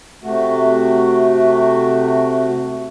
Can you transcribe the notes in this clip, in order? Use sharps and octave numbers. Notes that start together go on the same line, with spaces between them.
C3 A3 F#4